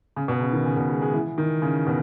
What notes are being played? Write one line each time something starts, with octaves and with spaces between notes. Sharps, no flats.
C#3
B2
C#3
D#3
C#3
B2
G#3
G#3
E3
D#3
C#3
B2